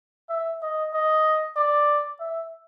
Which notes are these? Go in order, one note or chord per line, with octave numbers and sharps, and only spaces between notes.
E5
D#5
D#5
D5
E5